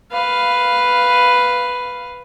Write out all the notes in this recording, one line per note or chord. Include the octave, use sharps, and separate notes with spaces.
B4 F5